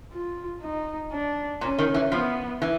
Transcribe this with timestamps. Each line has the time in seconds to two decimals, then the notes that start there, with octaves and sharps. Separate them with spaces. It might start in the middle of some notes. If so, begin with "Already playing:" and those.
0.13 F4
0.62 D#4
1.12 D4
1.61 A#2 C#4
1.78 D#3
1.94 E3
2.12 F3 B3
2.62 E3